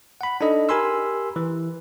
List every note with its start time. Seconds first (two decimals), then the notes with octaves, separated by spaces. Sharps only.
0.21 F#5 B5
0.41 D4 D#4 A4 D#5
0.69 G4 A#4 G#5 B5 C6 E6
1.36 E3